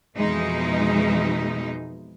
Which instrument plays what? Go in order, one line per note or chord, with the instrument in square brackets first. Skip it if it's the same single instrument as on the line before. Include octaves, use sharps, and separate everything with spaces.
[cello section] F2 B2 E3 G#3 D#4